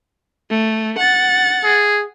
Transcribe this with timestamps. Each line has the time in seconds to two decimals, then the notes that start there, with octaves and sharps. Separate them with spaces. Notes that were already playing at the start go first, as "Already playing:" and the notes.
0.51 A3
0.98 F#5 A6
1.64 G#4